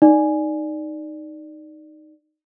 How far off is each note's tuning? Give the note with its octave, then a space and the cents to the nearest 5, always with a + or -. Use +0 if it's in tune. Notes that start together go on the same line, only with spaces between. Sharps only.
D#4 -5 D5 +0